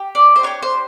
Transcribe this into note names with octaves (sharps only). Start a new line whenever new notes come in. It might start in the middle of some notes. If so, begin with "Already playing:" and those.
Already playing: G4
D5
C5
D4 G4 C#5
C5